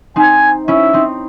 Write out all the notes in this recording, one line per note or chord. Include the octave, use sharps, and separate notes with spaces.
C4 D#4 G#5
C#4 E4 E5
C4 D#4